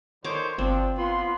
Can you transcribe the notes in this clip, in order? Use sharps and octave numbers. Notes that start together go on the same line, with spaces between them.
D3 D#3 C5 C#5 D6
G1 F3 C4 D4
B3 F4 C6